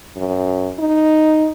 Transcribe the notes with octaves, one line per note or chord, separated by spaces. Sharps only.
F#2
D#4